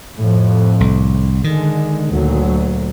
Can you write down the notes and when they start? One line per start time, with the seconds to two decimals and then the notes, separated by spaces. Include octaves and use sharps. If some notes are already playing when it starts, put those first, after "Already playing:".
0.17 F2 A2
0.81 C2
1.44 D3 D#3 G#3
2.12 D2 A#2 F#3